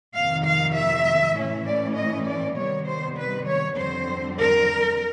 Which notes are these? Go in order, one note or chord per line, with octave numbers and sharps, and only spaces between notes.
F2 C3 D#3 F5
F5
E5
A2 E3 A3 C#4
D5
D#5
D5
C3 D#3 G3 B3 C#5
C5
B4
C#5
F2 D3 G3 C4 C5
A#4